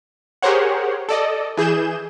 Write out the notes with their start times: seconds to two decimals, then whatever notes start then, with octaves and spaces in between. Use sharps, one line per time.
0.42 G4 G#4 A#4 C5 C#5 F#5
1.09 A4 D5 D#5
1.57 E3 G#4 G6 E7